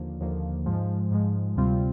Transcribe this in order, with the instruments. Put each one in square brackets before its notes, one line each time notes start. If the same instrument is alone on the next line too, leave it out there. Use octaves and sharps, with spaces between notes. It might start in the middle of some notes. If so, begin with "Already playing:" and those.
Already playing: [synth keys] D#2 D3 F3 A#3
D#2 D3 F3 A#3
G#2 F3 G#3
G#2 F3 G#3
D2 C3 G3 C4 F4